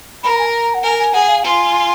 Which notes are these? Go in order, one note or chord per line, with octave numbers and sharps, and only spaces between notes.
A#4 B5
A#5
G#5
A#5
F#5
A#4 G#5
G#5
G#4 F#5
F5
F4 G#5